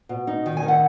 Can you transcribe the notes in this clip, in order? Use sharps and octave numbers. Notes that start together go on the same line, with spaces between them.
B2
D#4
D#3
G#5
D#3
F#5